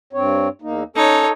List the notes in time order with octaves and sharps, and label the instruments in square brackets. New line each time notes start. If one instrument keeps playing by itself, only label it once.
[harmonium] G2 C4 C#5
E2 A#3 D#4
[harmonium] C#4 [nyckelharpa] D#4 C#5 [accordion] A4